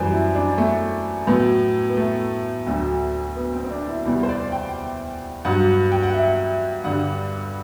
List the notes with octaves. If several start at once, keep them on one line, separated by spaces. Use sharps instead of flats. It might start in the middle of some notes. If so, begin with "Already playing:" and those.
Already playing: F#2 E3 G3 C5
E4
D4
A3
A2 F#3 B3
B3
A3
D2 D3 F#3
B3
C4
C4
D4
E4
E2 C3 G3 E4
C5
D5
G5
G2 F#3 F#5
G5
F#5
E5
G2 D3 G3 F#5